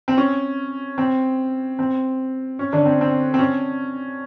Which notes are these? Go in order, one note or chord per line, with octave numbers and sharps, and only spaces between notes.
C4
C#4
C4
C4
C#4
D3 D4
C4
C4
C4
C#4